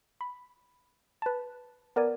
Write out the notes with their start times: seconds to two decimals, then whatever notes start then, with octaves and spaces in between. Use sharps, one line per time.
0.21 B5
1.22 B4 A5
1.96 B3 A#4 D5 G#5